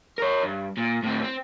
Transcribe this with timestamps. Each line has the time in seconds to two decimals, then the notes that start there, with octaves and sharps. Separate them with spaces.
0.18 A#4 C#5
0.43 G2
0.78 A#2
1.04 A2 C4
1.22 C4